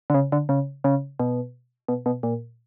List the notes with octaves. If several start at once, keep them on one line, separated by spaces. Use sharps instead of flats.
D3
C#3
D3
C#3
C#3
B2
B2
B2
A#2